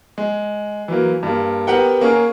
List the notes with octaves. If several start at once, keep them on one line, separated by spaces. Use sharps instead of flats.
G#3
E3 F#3 A#3
G2 A#3
B3 G4 A#4 F#5 G5
A#3 C#4 G#4 A#4